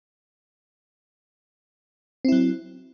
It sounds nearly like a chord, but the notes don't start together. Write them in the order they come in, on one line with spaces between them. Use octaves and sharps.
C4 E4 F#3